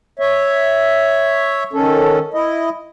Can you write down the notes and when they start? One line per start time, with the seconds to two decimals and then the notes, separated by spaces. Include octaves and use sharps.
0.19 C#5 E5
1.73 D#3 C#4 A4
2.34 E4 D#5